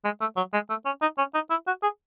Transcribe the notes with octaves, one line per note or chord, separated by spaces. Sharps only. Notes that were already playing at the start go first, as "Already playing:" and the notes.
G#3
A3
F#3
G#3
A3
C#4
D#4
C#4
D#4
E4
F#4
G#4